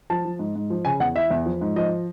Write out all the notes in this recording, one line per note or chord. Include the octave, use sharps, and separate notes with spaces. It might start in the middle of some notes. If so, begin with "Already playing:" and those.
F3 A5
F3
G#2
G#2
F3
C#3 G#5
E2 F#5
E3 E5
E2
F3
G#2
F3 D#5